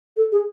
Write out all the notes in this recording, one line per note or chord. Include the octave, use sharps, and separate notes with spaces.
A4
G#4